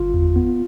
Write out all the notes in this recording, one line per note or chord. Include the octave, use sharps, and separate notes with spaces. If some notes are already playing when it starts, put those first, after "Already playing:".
Already playing: G1 F4
E2
B3